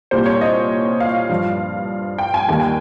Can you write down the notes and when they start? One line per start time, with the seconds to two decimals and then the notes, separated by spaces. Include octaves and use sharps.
0.11 C2 A#2 G3 C5
0.26 C#5
0.41 D#5
1.00 F5
1.29 G2 F3
2.18 G5
2.34 G#5
2.48 D#2 D#3 G3 G#5
2.60 G5